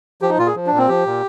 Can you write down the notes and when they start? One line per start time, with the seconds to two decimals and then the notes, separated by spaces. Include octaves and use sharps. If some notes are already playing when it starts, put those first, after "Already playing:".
0.22 F3 G4
0.29 D#4
0.38 A#2 F4
0.47 G#4
0.56 F3
0.67 A#2 D4
0.78 C4
0.88 F3 G4
1.06 A#2